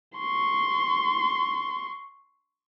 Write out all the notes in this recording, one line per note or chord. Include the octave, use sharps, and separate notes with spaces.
C6 C#6